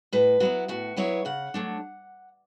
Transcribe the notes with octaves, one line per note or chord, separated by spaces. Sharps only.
A2 B4
F#3 B3 E4 F#4
A2 F#4
F#3 B3 E4 C#5
C#3 F#5
F#3 A3 D4